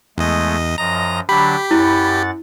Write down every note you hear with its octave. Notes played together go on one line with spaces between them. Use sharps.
E2 G#3 A3 D#5
F#2 F3 D#5 A#5
D3 F#3 D4 G4 B5
F#2 E4 F#5 A6